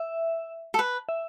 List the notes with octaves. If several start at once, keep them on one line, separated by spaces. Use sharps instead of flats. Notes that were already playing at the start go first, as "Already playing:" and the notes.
Already playing: E5
A4
B4
E5